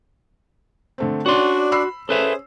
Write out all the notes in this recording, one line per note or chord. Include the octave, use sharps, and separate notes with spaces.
D3 A3 C4
C#4 D4 F#4 D5 C6
B5 E6 C7
C#4 G#4 A4 B4 C5 E5